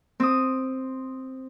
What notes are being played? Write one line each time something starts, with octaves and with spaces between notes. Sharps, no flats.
C4 D#6